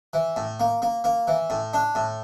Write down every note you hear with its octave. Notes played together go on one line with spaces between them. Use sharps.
E3
A2
A#3
A#3
A#3
E3
A2
D4
A2